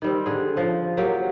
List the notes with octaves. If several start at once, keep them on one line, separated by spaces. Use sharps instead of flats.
D#3 G3 C4
D3 G#4
C#3 F3
F#3 A#3 G4 A#4